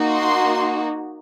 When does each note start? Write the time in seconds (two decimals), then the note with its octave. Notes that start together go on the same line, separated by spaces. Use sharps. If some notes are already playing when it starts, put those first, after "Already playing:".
Already playing: A#3 D#4 F#4
0.14 C6